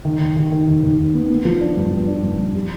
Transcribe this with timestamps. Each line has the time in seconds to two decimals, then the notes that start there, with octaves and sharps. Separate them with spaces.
0.05 D#3
0.21 D#2
0.36 D#3
0.52 D#3
0.68 D#2
0.83 D#2
0.98 D#2
1.14 B3
1.30 B3
1.45 F3
1.61 D4
1.77 G2
1.92 F3
2.07 D4
2.23 G2
2.39 G2
2.54 G3